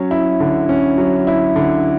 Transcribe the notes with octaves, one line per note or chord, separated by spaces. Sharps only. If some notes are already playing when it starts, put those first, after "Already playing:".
Already playing: F#3 C#4
E4
D3
C#4
F#3
E4
D3